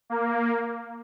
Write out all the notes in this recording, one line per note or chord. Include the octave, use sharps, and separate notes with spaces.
A#3